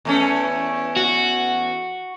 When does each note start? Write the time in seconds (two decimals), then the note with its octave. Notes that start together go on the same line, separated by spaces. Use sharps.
0.05 E2 A3 C#4
0.97 F#4